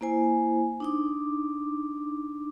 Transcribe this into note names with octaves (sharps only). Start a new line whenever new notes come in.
A#3 E4 C5 G#5
D4 D#4 D6